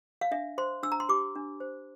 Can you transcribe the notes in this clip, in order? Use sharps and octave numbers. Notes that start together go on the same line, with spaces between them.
F5
D4 E5
C5 C6
D4 E6
A#5
C6
G4 D6
D4
C5